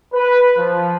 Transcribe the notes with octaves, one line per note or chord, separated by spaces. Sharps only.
B4
F3